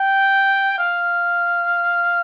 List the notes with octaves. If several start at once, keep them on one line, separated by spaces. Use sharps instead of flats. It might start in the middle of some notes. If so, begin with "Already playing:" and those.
Already playing: G5
F5